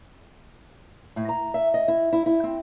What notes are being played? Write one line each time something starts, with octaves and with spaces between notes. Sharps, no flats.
A2
A#5
E5
D#5
E4
E4
E4
C4